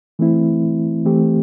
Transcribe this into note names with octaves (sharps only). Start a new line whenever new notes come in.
E3 A3 C4 E4
E3 A3 C4 G4